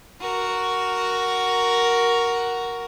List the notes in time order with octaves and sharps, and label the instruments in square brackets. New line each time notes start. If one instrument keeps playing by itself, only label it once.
[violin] F#4 A#4